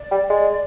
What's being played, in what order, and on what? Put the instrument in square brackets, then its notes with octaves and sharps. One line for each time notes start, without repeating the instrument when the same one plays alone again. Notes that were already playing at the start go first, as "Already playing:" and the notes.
Already playing: [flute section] D5
[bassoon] G3
G#3